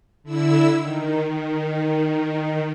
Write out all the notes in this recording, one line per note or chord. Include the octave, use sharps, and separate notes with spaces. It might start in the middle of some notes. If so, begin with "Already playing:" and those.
D3 E4 E6
D#3
D#3